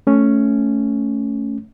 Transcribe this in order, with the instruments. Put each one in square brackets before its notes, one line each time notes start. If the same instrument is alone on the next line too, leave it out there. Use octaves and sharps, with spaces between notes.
[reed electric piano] A3 C#4